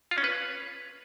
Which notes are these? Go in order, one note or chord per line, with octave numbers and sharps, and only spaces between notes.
F4
C#4
B4